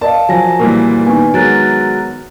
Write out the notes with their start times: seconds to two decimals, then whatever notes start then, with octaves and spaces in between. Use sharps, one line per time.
0.01 A#4 D5 D#5 F5 A5
0.29 F3 F#3 G#5 A#6
0.60 A#2 E3 G3 A#4
1.07 D#3 B3 G#5 C#6
1.34 F#3 G#3 A#4 F#6 A6 D7